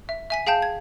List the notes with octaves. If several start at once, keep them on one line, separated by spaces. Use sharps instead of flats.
E5
E5 G#5 B6
G#4 F5 G5 A5 G6
G#6